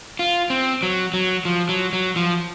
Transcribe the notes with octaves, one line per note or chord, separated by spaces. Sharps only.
F4
C4
F#3
F#3
F3
F#3
F#3
F3